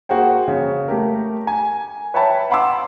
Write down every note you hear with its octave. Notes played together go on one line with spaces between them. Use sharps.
A#3 F#4 G#4 C5 G5
C#3
A3 G4 A#4
G#5
B4 C#5 E5 G5 A5 B5
F5 F#5 B5 C6 D6 E6